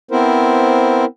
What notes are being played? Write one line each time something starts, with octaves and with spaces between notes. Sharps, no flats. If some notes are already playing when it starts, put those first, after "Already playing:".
B3 C4 E4 A#4 C5